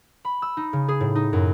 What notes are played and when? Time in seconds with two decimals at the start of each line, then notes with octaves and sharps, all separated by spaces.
0.25 B5
0.42 E6
0.57 D#4
0.73 C#3
0.88 G#4
1.00 A2
1.15 D#4
1.33 F#2